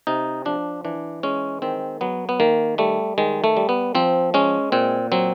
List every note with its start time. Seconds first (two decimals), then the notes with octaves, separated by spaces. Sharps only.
0.07 C3 D#4
0.45 F3 D4
0.85 E3 D4
1.23 G#3 C#4
1.62 D#3 C4
2.01 F#3 B3
2.29 B3
2.40 D#3 A#3
2.78 G3 A3
3.18 D#3 G#3
3.44 A3
3.57 G3
3.69 B3
3.95 F3 C4
4.34 G#3 C#4
4.72 A#2 C4
5.12 F#3 C4